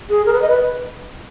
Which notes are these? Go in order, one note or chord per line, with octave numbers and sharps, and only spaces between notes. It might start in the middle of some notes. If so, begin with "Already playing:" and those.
G#4
A#4
B4
D#5
B4